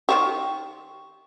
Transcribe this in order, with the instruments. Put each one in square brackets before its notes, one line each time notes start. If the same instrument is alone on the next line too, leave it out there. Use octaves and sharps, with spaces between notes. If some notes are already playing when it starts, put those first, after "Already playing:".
[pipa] D#3 C5 C#6 [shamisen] G4